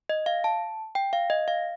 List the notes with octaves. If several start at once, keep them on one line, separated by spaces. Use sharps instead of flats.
D#5
F5
A5
G5
F5
D#5
F5